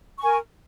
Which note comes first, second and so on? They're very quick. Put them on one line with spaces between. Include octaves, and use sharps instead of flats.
C#6 G#5 A#4